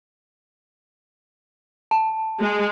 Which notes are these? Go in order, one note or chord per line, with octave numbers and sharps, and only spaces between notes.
A5
G#3